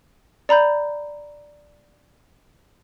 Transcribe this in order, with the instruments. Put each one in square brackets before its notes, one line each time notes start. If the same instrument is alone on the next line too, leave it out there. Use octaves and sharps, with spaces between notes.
[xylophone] D5 A#5 B5 G6